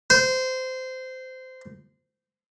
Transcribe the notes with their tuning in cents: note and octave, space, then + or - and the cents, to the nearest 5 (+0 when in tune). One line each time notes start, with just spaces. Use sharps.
C5 -20